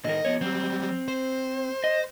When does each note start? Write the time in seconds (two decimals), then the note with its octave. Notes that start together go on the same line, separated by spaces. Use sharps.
0.05 A2 D#3 A#4 D#5
0.25 F2 B3 C#5
0.41 F#3 G3 C4
1.08 C5
1.84 D#5